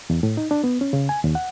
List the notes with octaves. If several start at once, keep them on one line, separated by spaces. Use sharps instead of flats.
E2
A2
D#4
D4
B3
C#4
C#3
G#5
D#2
F#5